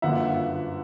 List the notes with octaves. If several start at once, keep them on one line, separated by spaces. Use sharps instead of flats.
G1 F#2 D3 F3 A#3 E5 F#5